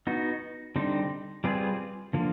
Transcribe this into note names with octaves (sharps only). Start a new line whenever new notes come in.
B3 D#4 F#4
D3 G3 C4 D#4
G3 C4 F4 G#4 B4
D3 F3 A#3